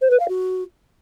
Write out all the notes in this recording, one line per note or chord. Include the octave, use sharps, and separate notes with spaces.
C5
B4
F5
F#4